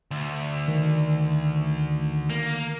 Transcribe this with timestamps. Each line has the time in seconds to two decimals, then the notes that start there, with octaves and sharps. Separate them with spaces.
0.11 D2
0.68 D#3
2.30 A#3